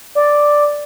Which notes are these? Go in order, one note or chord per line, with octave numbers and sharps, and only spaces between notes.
D5